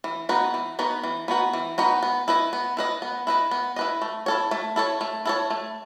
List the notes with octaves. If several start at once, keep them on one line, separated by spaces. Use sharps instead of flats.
E3
B3 D#4 F#4 B4
E3
B3 D#4 F#4 B4
E3
B3 D#4 F#4 B4
E3
B3 D#4 F#4 B4
B3
E4 B4 D#5
B3
E4 B4 D#5
B3
E4 B4 D#5
B3
E4 B4 D#5
A3
E4 A4 C#5
A3
E4 A4 C#5
A3
E4 A4 C#5
A3